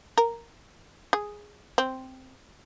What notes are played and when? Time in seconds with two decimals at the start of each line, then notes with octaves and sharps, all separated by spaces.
0.18 A#4
1.13 G#4
1.78 C4